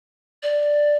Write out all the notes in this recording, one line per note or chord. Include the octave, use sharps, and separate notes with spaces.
D5